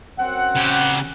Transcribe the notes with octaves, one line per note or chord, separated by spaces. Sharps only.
F#2 C4 F#5
C#3 G4